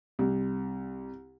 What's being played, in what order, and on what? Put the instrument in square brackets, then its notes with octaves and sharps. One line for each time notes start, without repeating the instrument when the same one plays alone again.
[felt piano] C2